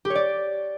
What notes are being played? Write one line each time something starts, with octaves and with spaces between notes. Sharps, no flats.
G4
C#5
D5